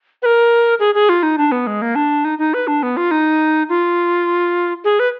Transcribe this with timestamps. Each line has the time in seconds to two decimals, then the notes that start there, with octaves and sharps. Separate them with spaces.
0.22 B4
0.26 A#4
0.80 G#4
0.95 G#4
1.09 F4
1.23 D#4
1.38 D4
1.52 B3
1.67 G#3
1.82 A#3
1.95 D4
2.25 D#4
2.39 D#4
2.54 B4
2.67 D4
2.83 B3
2.97 F4
3.11 D#4
3.69 F4
4.84 G#4
5.00 B4